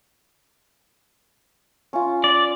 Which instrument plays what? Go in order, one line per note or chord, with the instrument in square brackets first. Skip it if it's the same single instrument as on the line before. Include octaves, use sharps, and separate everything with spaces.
[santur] C#4 F4
[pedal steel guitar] D5